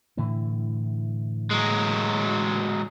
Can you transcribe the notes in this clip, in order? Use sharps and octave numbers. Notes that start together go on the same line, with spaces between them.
A2 D3 E3
F#3 G#3